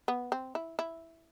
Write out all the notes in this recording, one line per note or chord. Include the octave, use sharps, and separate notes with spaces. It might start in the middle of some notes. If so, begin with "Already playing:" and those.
B3
C4
E4
E4